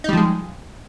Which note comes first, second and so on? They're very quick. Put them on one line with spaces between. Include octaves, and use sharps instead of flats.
D#4 G3 F3 G#3